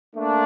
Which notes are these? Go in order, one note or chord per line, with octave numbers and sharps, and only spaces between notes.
A3 A#3 D4